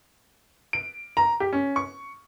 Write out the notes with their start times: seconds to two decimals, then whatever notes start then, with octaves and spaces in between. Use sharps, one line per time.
0.73 D7
1.17 A#5
1.40 G4
1.53 C#4
1.76 C#6